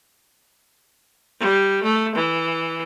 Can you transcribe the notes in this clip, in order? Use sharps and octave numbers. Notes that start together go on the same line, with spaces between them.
G3
A3
E3